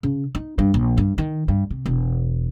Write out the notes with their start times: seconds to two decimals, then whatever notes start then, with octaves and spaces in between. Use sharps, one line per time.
0.03 C#3
0.35 D#4
0.59 G2
0.74 A#1
0.98 G2
1.18 D#3
1.48 G2
1.71 C3
1.86 E1